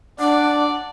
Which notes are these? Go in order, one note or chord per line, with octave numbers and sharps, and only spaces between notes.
D4 D5 F#5